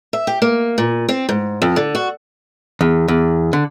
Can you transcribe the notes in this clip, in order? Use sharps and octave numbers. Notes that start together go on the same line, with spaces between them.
E5
G4
A#3
A#2
C4
G#2
F2
D3
F#4
E2
E2
D3